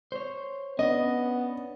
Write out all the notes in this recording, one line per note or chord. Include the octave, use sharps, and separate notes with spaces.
C5 C#5
B3 C#4 D4 D#5